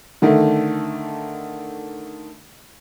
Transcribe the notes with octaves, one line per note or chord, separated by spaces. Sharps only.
D3 D#3 A3